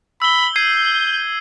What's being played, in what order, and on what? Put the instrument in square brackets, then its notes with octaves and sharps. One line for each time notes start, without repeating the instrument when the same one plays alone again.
[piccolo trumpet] B5 [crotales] E6 G7
[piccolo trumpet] G6 [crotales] G#6 C7 D#7